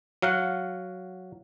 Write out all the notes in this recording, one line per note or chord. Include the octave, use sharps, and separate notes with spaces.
F#3 F5 F#5